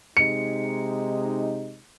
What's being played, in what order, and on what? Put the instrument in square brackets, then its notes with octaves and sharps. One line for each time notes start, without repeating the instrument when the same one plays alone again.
[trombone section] C3 G#3 D#4 [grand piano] C#7